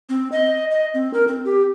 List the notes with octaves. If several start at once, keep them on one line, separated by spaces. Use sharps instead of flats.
C4
D#5
D#5
C4
A#4
C4
G4